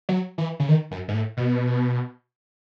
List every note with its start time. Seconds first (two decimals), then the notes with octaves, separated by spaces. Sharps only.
0.09 F#3
0.38 E3
0.59 C#3
0.68 D#3
0.91 F#2
1.08 G#2
1.14 A2
1.37 B2